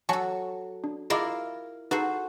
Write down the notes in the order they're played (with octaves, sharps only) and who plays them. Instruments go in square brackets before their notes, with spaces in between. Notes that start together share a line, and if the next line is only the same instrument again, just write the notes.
[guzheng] F#3 A4 [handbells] G#5 A5 C#6
[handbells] D4
[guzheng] E4 F4 A#4 [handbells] G#4 D#5 D6
[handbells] D#4 G#4 B4 [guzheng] F#4 A4 C5